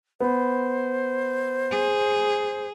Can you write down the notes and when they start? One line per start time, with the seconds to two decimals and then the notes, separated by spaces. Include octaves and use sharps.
0.20 B3 C5
1.72 G#4